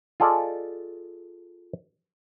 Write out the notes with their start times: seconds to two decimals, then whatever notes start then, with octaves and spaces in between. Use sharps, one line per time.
0.20 F4 G#4 A4 D5 D#5